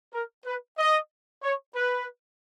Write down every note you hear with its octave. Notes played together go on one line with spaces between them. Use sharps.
A#4
B4
D#5
C#5
B4